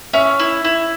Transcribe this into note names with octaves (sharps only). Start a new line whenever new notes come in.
C#4 E5
E4
E4